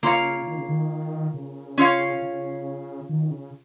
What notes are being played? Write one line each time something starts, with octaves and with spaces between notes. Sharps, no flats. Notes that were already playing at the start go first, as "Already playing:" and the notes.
C#3 A#3 F4 C#5 F5
D#3
C#3
D#3
C#3
C#4 F4 C#5 F5
C#3
D#3
C#3